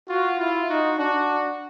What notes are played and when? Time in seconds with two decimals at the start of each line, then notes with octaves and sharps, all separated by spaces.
0.09 F4 F#4
0.40 E4 F4
0.69 D#4 F#4
0.98 D4 F#4